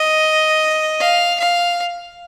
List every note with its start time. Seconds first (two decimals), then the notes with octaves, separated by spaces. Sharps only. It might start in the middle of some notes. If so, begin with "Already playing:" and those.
Already playing: D#5
1.00 F5
1.40 F5